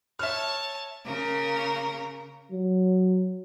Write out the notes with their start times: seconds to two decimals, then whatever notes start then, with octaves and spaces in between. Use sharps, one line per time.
0.19 C#5 E5 A5 F6
1.05 C#3 A#3 A#4
2.52 F#3